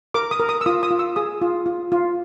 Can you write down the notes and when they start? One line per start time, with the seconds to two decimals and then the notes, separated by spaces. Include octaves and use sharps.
0.14 A#4 D6
0.31 D#6
0.40 A#4
0.49 D#6
0.61 E6
0.66 F4 D#6
0.83 D#6
0.91 F4
0.99 E6
1.16 G#4 D#6
1.42 F4
1.66 F4
1.92 F4